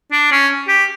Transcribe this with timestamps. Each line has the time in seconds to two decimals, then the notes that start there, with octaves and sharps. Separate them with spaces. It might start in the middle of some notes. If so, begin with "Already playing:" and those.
0.12 D4
0.32 C#4
0.68 G4